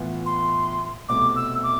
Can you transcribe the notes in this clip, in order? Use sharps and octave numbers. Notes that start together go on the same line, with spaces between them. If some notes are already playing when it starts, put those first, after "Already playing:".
Already playing: A2 E3 B3 F4
C6
C2 B2 A3 C4 E4 D6
E6
D6